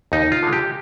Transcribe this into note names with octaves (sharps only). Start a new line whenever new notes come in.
D#2 D#4
F4
D3 G#3
G4